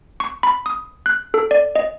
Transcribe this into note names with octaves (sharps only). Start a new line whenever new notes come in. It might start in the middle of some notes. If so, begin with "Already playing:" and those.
C#6
B5
D#6
F#6
A4
D5
D#5